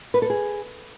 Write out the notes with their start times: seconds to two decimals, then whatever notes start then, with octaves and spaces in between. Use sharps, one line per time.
0.14 B4
0.22 A4
0.30 G#4